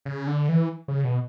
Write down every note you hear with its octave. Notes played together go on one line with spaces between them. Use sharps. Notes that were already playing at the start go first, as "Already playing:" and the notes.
C#3
D3
E3
C#3
B2